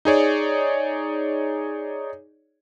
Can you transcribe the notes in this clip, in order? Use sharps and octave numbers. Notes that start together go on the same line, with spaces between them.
D#4 G#4 C#5 D5